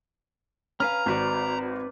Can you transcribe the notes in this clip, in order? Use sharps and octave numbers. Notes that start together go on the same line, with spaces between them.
C#4 B4 F5 A#5 F6
G#1 C4 F#4 B4 D5